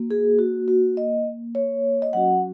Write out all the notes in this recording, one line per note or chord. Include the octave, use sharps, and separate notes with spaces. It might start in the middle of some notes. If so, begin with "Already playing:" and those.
Already playing: A#3 F#4
G#4
F#4
F#4
D#5
C#5
D#5
F#3 C#4 F#4 F#5